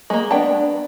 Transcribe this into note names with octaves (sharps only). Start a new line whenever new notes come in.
G#3 A#3
B3 D4 G5 A5